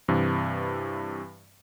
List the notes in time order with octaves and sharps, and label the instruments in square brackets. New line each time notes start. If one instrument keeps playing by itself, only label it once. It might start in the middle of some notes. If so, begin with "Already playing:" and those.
[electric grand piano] G2 C3 E3